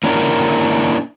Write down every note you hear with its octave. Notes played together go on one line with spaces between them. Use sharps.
A#3 C#4 D4 E4 A4 A#4